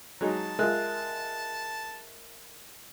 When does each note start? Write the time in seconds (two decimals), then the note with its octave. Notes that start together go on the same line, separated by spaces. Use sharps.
0.21 F#3 G#3 D#4 A5
0.59 G#3 F4 A#4 E5 F#6